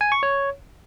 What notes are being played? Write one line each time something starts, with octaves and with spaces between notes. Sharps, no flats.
G#5
C#6
C#5